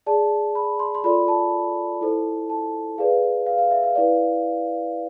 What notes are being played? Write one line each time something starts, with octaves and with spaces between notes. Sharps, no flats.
G#4 D5 A5
B5
C6
C6
F4 A4 D5 B5
A5
E4 A4 C5
A5
G#4 B4 D5 F5
F5
F5
E5
F5
E4 B4 D5